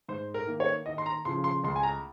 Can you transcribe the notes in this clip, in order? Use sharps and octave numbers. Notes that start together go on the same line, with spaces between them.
G#2 C5
A#4
D#3 A#3
C#5
D#2 D#5
C6
A#5
C#3 F3 C6
C6
C#2 C6
G#5
A#5